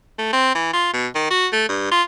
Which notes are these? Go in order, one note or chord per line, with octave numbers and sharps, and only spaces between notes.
A3
C4
E3
F4
B2
D#3
F#4
A3
G2
F4